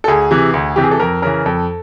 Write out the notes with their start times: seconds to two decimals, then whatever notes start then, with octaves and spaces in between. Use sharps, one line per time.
0.04 A4
0.08 D2 G#4
0.31 C3 E3
0.54 D2
0.76 C3 E3 G4
0.83 G#4
0.91 A4
0.99 F2 A#4
1.22 C#3 E3 A#4
1.46 F2 A4